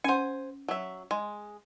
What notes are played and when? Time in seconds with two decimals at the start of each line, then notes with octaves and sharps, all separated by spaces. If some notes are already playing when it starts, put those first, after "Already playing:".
0.04 C#4 C5 F#5 G#5
0.68 F#3 E5
1.11 G#3